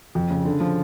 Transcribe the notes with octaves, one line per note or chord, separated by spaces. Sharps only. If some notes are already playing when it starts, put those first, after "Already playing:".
F2
C#3
D3
F3